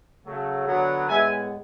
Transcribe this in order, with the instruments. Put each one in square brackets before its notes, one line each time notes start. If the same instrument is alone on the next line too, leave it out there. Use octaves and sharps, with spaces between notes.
[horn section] C#3 F#3 A3
D3 F#3 B3
A2 G#3 B3 E5 G#5